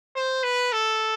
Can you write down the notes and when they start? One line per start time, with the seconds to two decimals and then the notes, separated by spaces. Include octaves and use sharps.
0.16 C5
0.44 B4
0.72 A4